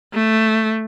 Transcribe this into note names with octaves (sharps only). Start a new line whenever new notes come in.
A3